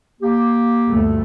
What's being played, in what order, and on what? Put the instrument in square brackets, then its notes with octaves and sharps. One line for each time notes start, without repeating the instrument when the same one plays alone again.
[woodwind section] A#3 G4
[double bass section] D2 G2 A3